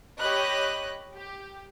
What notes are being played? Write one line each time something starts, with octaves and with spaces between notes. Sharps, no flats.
G4 C#5 D#5 B5 F#6
G4